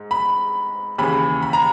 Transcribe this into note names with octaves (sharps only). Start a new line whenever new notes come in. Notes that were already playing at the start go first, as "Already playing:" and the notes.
Already playing: G#2
B5
D#2 C#3 E3 B5
B5
A#5